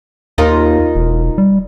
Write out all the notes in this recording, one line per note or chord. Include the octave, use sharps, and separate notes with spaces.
D#2 D#4 F4 A#4
E1
G3